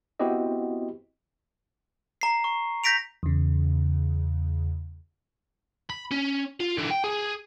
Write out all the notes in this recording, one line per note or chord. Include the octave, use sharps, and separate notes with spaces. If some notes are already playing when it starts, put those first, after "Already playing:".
B3 C4 E4 F#4 G4 D#5
A#5 C7
C#6
G6 A#6 B6 D7 F7
E2 C#3
B5
C#4
F4
D3 E3
G5
G#4